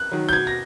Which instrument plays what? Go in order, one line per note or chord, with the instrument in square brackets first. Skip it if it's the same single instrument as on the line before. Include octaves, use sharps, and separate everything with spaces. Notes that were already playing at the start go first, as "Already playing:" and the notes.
Already playing: [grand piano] F#6
[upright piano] D#3 F#3
[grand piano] G6
[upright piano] B2 [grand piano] G#6
[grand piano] A#6